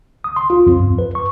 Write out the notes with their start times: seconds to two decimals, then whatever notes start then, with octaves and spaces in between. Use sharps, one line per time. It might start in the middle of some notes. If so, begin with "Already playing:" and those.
0.24 D#6
0.36 C6
0.50 F4
0.67 F2
0.80 G2
0.99 B4
1.15 C#6